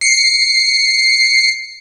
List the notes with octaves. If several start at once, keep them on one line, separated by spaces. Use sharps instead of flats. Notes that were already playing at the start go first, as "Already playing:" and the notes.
C7 C#7